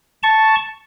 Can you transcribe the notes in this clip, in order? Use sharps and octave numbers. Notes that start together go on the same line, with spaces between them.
A5 C#6